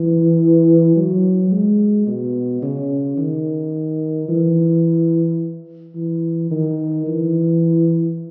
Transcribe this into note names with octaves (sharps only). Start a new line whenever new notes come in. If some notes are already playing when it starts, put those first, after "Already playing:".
Already playing: E3
F#3
G#3
B2
C#3
D#3
E3
E3
D#3
E3